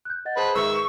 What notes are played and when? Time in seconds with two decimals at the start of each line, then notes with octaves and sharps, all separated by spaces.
0.05 F#6 G6
0.25 D#5 F#5 A6
0.37 G#4 B4 C5 A5
0.55 G#2 D#3 G#4 B4 E5 C#6 E6